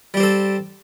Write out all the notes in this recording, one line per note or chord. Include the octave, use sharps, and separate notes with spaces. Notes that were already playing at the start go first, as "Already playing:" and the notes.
G3 C4 G4 A4